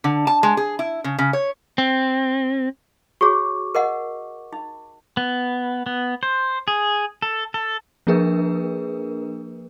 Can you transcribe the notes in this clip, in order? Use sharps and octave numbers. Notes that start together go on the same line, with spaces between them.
D3
A5
G#3
G#4
E4
C#3
C#3
C#5
C4
F#4 G#4 C#5 C#6 D6
A#4 D#5 F#5
D#4
B3
B3
C5
G#4
A4
A4
F3 A#3 D4 G#4 A#4 B4